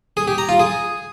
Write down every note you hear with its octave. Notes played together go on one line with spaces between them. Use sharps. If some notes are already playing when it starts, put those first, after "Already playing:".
G#4
G4
A#5
F4
G#4